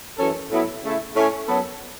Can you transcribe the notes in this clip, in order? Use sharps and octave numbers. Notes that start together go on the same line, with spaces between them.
F#2 E3 C#4 A4
A2 F#3 B3 E4
C#3 A3 E4
A2 A3 C#4
F#2 F#3 B3 A4